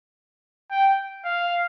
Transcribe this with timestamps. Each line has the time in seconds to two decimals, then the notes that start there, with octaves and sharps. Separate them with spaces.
0.71 G5
1.25 F5